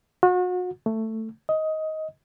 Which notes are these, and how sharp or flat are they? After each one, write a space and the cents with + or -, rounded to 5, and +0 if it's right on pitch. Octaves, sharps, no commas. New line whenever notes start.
F#4 -35
A3 +10
D#5 +15